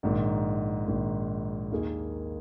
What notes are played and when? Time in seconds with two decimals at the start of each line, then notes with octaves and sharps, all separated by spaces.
0.03 A#1 G#2 D#3
0.87 A#1 G#2 D#3
1.72 D#2 D#3 A#3 G#4